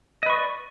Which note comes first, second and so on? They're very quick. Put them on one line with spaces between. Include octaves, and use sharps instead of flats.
D#5 B4 C#6 D5